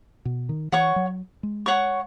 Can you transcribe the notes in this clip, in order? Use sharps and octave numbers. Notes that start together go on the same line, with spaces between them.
B2
D#3
E3 C#5 F#5 C#6
F#3
G#3
C#5 F#5 C#6